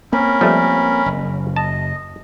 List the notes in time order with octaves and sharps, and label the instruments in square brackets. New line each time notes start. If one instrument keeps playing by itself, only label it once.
[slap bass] A#3 C4 [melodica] C#4 A#4 B5
[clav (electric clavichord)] F3 G3 A3
[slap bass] F#1
[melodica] D#5 [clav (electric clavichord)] A5